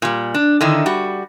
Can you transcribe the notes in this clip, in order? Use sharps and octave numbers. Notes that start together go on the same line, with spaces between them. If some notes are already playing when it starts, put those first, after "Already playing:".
A#2 G3
D4
D3 D#3 D#4 E4
G3 F#4